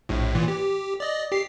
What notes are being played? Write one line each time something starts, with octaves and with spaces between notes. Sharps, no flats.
A#1 A2
A#2 E3
G4
D5 D#5
G4 C7